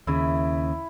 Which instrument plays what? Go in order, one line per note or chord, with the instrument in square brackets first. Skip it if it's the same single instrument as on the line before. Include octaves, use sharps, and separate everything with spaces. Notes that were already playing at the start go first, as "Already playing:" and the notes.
[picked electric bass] D#2 C#3 [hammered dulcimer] E4